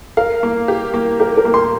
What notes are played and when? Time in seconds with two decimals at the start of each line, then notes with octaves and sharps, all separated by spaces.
0.17 A#4 F5
0.43 A#3
0.68 G4
0.94 A#3
1.20 G4 A#4
1.37 A#4
1.45 A#3
1.54 C6